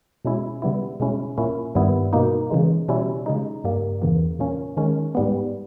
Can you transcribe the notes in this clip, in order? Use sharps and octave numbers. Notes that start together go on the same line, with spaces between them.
B2 G#3 C#4 E4
C#3 G3 B3 E4
B2 G#3 C#4 E4
A#2 A#3 C#4 E4
G2 D#3 G3 B3 E4
B2 A#3 D#4
C#3 E3 G#3
B2 G3 C#4 E4
C#3 G#3 D#4
G2 G3 A#3
E2 C#3 E3 A#3
A#2 A#3 C#4
D#3 G#3 C#4
G#2 G3 B3